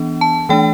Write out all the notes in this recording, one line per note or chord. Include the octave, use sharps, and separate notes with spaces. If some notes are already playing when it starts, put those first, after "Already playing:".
Already playing: E3 B3 D4
A5
E3 A3 D4 G5